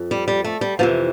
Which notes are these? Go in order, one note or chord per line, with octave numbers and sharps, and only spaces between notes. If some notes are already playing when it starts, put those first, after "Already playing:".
Already playing: F2
G3
G3
A3
G3
F2 C3 E3 F3